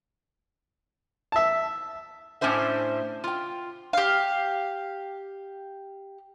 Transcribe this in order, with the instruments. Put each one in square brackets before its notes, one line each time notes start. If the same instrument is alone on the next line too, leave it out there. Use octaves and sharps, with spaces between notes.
[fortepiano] E5 A5
[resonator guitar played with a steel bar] A2 C#4 D4 C5 E5
F4 G5
[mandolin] G4 F5